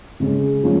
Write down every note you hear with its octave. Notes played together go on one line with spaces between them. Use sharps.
C#3 G#3 C#4 G#4
F3 G#3 C#4 F4